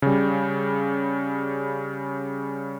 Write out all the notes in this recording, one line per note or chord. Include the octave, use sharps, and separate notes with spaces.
C#3 G3